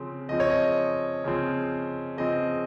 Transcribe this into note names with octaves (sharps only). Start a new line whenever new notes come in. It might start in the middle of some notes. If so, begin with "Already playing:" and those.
Already playing: C#3 F3 C4
C#3 F3 C4 D#5
C#5
D#5
C#3 F3 C4
C#3 F3 C4 D#5